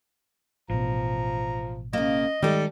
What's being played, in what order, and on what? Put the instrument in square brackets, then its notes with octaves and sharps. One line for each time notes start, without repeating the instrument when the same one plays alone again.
[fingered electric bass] A1 B2 [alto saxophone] F3 [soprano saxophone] A#5
[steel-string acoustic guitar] C#3 A#3 [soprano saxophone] D#5
[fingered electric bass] D#3 G#3 [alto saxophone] G3 [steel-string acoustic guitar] D#4 A4